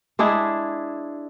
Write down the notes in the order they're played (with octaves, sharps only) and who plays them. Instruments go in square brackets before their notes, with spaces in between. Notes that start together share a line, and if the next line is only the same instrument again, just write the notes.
[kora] G#3 D4 E4 G#4